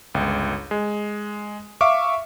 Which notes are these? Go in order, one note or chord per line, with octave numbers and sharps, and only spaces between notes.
G1 C#2
G#3
E5 F5 C#6 D6